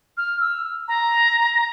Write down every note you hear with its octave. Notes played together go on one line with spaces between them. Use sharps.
F6
E6
A#5